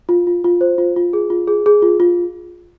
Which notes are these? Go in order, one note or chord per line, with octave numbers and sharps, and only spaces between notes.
F4
F4
F4
C5
F4
F4
G#4
F4
G#4
G#4
F4
F4